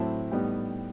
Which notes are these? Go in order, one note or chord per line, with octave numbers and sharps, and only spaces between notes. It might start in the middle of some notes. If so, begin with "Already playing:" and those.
Already playing: A2 F#3 C4 E4 A5
A2 G3 B3 D#4 G5